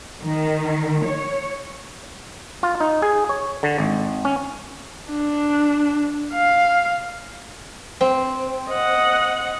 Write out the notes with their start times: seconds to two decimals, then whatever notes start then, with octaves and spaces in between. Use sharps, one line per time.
0.22 D#3
1.05 C#5
2.63 F4
2.80 D#4
3.02 G#4
3.29 C#5
3.63 D3
3.78 G#1
4.25 C#4
5.10 D4
6.34 F5
8.01 C4
8.69 D#5 F#5